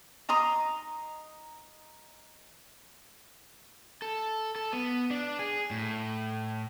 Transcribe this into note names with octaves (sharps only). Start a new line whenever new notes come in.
D#4 A#5 C6 D#6
A4
A4
B3
D4
G#4
A2